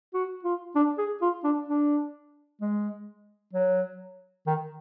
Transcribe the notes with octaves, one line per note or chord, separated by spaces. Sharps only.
F#4
F4
D4
G#4
F4
D4
D4
G#3
F#3
D#3